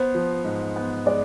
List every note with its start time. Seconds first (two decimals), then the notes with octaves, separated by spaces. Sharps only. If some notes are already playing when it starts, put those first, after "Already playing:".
Already playing: B3 C5
0.15 F3
0.44 G#2
0.76 B3
1.06 G#3 D5